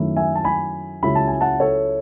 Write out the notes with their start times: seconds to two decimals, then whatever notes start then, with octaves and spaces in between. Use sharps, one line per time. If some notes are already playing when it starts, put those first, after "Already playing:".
Already playing: F#2 D#3 A3 C#4 E4
0.16 E5 G#5
0.35 A5
0.44 G#5 B5
1.02 C#2 C#3 F#3 C#4 E4 B5
1.15 A5
1.28 G#5
1.41 F#5 A5
1.60 A4 C#5